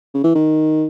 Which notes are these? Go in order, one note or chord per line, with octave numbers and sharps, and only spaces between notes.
C#3
E3
D#3